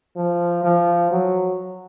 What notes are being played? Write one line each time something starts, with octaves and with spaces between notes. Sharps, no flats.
F3
F3
F#3